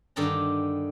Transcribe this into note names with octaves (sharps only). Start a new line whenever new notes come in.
G2 D3 D#3 A5 A#5